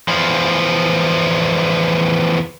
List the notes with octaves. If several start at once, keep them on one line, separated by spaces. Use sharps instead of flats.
E2 F3